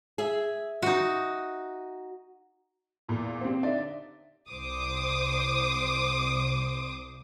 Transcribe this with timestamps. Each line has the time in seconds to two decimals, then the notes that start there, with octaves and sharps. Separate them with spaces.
0.18 G#4 E5
0.82 D#4 F#4
3.08 E2 A#2
3.41 C4 G4 C5
3.63 D3 D#4 D5 E5
4.50 C2 C5 D6 D#6